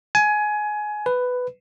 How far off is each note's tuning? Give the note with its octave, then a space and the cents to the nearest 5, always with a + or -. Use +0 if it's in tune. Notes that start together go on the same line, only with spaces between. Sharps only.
G#5 +20
B4 +10